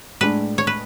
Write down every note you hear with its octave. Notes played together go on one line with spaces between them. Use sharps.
A2 G#3 D4 B4
C#5
B4